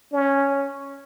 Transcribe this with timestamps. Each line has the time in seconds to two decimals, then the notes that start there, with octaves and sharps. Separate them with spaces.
0.12 C#4